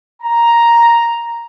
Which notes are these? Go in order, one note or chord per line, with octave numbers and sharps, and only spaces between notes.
A#5